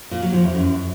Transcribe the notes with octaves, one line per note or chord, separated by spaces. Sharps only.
A#2
F#3
F3
E2
F#2